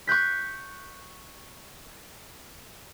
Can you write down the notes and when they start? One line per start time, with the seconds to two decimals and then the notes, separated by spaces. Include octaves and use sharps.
0.07 C#6 F#6 G6 B6